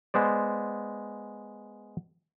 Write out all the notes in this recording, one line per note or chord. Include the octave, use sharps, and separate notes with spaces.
G#3 B3 C5 D5